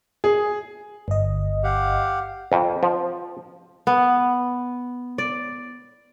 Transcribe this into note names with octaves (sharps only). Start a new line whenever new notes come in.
G#4
G1 D#5
G4 F5 F#5
F2
F3
B3
D5